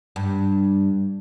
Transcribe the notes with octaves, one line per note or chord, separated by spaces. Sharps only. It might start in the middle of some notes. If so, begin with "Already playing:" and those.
G2